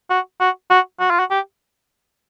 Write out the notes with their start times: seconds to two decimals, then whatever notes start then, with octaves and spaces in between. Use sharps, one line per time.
0.10 F#4
0.40 F#4
0.70 F#4
1.00 F#4
1.10 F4
1.20 F#4
1.31 G4